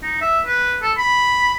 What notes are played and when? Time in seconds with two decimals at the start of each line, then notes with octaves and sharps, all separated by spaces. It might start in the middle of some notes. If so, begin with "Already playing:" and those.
0.03 D#4
0.21 E5
0.46 B4
0.82 A4
0.98 B5